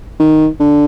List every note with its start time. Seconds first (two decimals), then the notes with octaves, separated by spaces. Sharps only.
0.19 D#3
0.60 D3